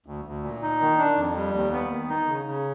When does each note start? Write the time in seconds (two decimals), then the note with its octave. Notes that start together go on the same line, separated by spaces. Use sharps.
0.06 D2
0.25 D2
0.43 A#2
0.62 D#4
0.81 D#3
0.98 D4
1.17 F2
1.36 G3
1.54 D#2
1.73 B3
1.91 D#3
2.09 D#4
2.28 C#3
2.46 C#3